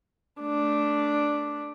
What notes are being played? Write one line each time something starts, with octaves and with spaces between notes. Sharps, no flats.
A3 D4